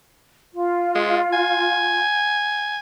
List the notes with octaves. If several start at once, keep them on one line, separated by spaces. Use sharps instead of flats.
F4
G#3
G#5